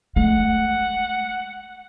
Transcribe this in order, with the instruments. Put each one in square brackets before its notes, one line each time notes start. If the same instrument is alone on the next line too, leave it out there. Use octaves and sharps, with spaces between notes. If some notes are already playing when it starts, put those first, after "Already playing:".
[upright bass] G#3 A3 [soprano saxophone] F#5